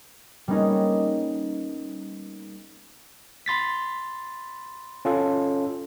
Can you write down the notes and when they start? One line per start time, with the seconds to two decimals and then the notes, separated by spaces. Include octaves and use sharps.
0.48 G3 A#3 B3 C#4 D#4 G#4
3.46 B5 C6 A6 B6
5.05 C#4 F4 A4